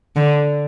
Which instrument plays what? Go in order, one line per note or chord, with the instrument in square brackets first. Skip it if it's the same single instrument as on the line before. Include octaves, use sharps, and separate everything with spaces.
[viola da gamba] D3